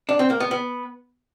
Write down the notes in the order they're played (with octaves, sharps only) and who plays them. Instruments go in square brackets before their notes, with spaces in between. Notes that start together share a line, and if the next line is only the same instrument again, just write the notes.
[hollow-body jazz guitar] D4
C4
A#3
B3
B3